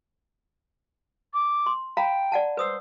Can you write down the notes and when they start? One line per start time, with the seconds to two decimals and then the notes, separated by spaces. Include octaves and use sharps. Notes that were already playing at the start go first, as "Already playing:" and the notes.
1.34 D6
1.66 C6
1.97 F5 G5 A#5 B5
2.32 D5 F#5 A5
2.57 B4 C5 D#6 E6